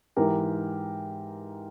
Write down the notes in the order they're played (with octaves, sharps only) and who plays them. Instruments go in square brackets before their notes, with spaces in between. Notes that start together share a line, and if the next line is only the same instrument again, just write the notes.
[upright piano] G#2 E3 G4 A#4